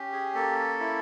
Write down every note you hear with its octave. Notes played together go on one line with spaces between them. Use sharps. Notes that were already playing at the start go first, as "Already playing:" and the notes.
Already playing: C#4 G4
G#4
A#3 A4
E4